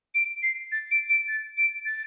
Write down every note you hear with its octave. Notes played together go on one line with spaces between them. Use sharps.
D7
C7
A6
D7
D7
A6
D7
A6